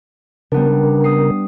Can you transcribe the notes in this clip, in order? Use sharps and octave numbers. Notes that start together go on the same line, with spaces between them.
C#3 G3 B3 D4 A#4
D#6 C7